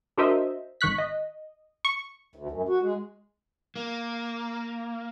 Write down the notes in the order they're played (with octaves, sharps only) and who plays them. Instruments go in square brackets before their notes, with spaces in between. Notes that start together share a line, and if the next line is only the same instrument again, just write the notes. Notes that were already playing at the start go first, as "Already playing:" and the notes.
[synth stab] D4 F#4 A#4 C5 D#5 E5
G#1 D#3 C#6 F#6 B6
D#5
C#6
[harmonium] D2
F#2
F#4
G#3
[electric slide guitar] A#3